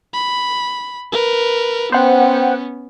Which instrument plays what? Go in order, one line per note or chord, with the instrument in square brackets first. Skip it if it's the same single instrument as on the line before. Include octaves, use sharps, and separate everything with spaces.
[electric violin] B5
A#4 B4
[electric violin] B3 C#4 [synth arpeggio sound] C5 F#5 G5